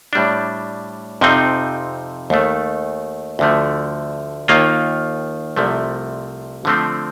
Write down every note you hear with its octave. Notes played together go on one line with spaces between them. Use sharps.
A2 G3 D4
F2 C3 F3 C4 D#4
D#2 D#3 A3
D2 D3 F3 A3
D#2 D#3 A#3 F4
C2 C3 F3 A3
D3 F3 A3 C4